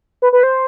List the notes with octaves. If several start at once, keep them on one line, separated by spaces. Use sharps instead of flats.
B4
B4
C5